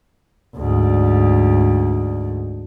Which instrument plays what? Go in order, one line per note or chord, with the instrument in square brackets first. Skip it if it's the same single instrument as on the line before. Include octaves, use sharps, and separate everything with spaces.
[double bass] D2 G#2